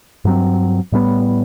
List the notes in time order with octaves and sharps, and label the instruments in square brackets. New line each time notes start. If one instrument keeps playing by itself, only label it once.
[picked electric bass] G2 F#3 C4
A2 G3 B3